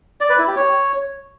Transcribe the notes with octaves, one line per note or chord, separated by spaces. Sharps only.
D5
B4
E4
G4
C#5